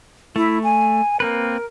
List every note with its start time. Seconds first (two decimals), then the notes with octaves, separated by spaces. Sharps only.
0.36 A3 E4
0.64 G#5
1.20 A#3 C4 A#4 B4